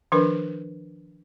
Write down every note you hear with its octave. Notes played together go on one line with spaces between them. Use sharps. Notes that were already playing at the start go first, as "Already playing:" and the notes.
D#3 F3 D4 A#4 B4